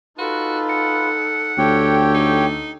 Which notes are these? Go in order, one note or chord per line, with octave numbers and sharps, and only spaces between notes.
D#4 F4 F#4 A4 B4
F#5
D2 G4 A4 C#5 G5
D#4